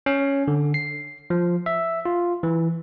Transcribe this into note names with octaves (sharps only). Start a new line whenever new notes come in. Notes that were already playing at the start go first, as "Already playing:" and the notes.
C#4
D3
C7
F3
E5
F4
E3